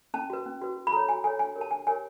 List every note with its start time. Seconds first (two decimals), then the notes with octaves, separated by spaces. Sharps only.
0.14 C#4 A5
0.30 F#4 B4
0.46 C#4
0.62 F#4 B4
0.77 F#4
0.87 B5
0.93 A4 C#5 A#5
1.08 F#4 G#5
1.24 A4 C#5 G#5
1.39 D4 G#5
1.56 G4 A#4 C#5
1.61 A5
1.71 D4 G#5
1.87 G4 A#4 C#5 G#5